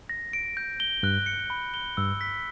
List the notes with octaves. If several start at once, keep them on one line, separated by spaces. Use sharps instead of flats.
A#6
D7
G6
G7
G2 F#6
C#7
B5
G7
G2 E6
B6